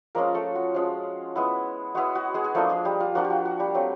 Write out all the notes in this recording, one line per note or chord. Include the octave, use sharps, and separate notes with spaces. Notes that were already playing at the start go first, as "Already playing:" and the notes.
F3 G#3 A#3 C#4 F4 A#4
A3 A4
F#4
F3 G#3 C#4 F4
G#3 B3 E4
G#3 B3 E4 F#4
F#4
G#3 G#4
G#4
F3 A3 A#3 D4 F4 A4
G#3 G#4
G3 G4
F4
F3 A#3 D4 F4 F#4
G4
F#4
F#4
G3 G4
F#3 A3 C4